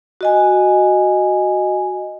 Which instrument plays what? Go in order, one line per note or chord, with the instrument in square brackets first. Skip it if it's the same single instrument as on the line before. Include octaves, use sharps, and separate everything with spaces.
[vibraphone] F#4 D#5 G#5